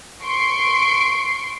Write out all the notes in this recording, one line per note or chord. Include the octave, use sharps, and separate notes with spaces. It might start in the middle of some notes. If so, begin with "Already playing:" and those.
C6 C#6 C7 D7